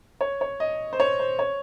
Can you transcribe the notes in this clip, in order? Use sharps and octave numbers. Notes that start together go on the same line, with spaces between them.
C#5
C#5
D#5
C5
C#5
C5
C#5